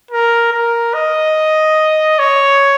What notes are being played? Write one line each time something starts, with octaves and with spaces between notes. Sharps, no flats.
A#4
A#4
D#5
C#5